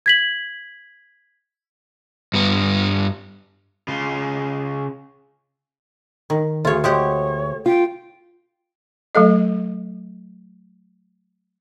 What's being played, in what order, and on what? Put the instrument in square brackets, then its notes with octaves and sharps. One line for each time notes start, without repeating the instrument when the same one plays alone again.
[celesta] G#6 B6 F#7
[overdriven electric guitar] G2 B3
C#3 F4
[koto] D#3
[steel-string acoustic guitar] D2 [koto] F4 C#5 [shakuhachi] G#4
[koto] G#3 G4 F#5 [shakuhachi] C#5
[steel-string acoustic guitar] F4 [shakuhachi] G5
[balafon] F#3 A3 A4 D#5